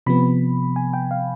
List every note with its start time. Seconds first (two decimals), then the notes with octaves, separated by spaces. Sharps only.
0.06 C3 F3 B3 B5
0.76 G#5
0.93 G5
1.11 F5